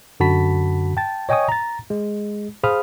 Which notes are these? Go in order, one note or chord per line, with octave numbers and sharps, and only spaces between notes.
F#2 D3 F#4 A5 B5 B6
G5 A5 A6
C#5 D#5 G5 G#5 C#6 D#6
A#5 A6
G#3
G#4 C5 F5 B5 D#6 F6